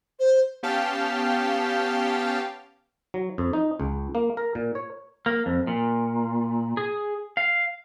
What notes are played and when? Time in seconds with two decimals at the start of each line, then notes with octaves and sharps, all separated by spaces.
0.19 C5
0.63 B3 C#4 G4 F5 G5 A5
3.14 F#3
3.38 F2
3.53 D#4
3.80 C#2
4.15 A#3
4.37 A#4
4.55 A#2
4.75 C#5
5.26 A#3
5.46 F2
5.67 A#2
6.77 G#4
7.37 F5